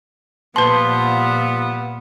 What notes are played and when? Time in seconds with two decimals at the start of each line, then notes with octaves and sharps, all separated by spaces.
0.56 A#2 F3 G3 B3 B4 A5 C6